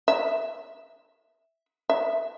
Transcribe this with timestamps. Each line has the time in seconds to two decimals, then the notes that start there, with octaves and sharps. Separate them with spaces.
0.08 E5
1.89 E5